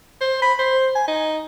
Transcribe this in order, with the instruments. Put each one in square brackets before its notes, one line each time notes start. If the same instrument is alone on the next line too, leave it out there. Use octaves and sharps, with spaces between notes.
[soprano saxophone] C5
B5
C5
G#5
D#4